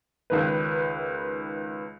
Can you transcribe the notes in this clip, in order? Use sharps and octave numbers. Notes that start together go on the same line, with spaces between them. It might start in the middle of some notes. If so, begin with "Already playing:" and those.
C#2 D#3 B4